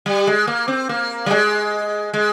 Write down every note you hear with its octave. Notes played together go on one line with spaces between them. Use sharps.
G3
G#3
A#3
C4
A#3
G3
G#3
G#3